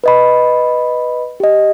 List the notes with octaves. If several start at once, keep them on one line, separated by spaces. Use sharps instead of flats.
B4 D#5 B5
G4 D#5